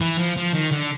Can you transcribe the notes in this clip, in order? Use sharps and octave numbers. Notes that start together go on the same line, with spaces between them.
E3
F3
F3
D#3
D3